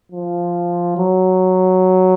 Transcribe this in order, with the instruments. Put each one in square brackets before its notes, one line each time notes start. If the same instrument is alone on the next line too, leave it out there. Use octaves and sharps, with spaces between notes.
[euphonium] F3
F#3